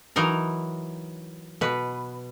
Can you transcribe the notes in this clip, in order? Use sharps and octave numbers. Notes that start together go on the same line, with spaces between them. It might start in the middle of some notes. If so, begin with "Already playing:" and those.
E3 F#3 D#4 A#4
B2 B4